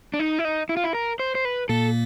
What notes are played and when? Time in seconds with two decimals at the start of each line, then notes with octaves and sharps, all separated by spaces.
0.14 D4
0.20 D#4
0.39 E4
0.45 D#4
0.69 E4
0.77 F4
0.84 E4
0.94 A#4
1.19 C5
1.35 C5
1.45 B4
1.69 A#2 A#3 A4